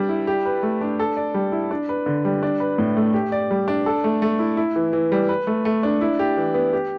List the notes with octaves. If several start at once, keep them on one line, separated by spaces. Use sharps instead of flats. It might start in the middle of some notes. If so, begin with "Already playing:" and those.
Already playing: G3 D4 D5
E4
G4
B4
A3
D4
A4
D5
G3
E4
D4
B4
D3
G3
D4
B4
A2
A3
G4
D5
G3
D4
A4
A3
A3
E4
E4
E3
E3
G3
B4
A3
A3
D4
E4
G4
E3
B3
G4